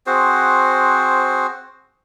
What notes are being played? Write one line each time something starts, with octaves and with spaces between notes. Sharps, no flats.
C4 F#4 G#4 C5